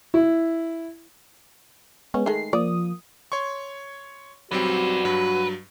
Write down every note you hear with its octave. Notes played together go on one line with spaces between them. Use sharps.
E4
G#3 B3 C#4
D#3 G#3 A3 C7
F3 A#3 D5 D#6
C#5 C6 C#6
F#3 G3 C4 F#4 B4 D5
G2 F#3 B4